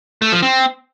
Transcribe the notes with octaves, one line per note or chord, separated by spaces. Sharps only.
A3
F3
C4